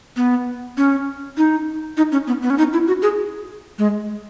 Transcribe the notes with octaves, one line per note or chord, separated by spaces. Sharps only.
B3
C#4
D#4
D#4
C#4
B3
B3
C#4
D#4
E4
F#4
G#4
G#3